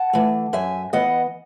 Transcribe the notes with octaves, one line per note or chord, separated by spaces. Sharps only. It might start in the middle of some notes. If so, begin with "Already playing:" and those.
Already playing: F#5 A5
E3 A3
F#2 E5 G#5
E3 B3 D#5 F#5